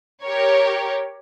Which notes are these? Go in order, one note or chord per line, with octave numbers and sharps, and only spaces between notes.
G4 A#4 C#5